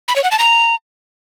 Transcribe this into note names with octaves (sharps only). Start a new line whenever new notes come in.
B5
C#5
F#5
A5
A#5